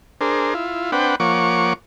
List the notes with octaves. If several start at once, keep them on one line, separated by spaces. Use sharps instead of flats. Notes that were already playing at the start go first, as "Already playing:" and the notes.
D4 G#4 A#4 C5
E4 F4
C4 D4 B4 F#5 G5
F3 A#3 C#5 F#5 C#6 D6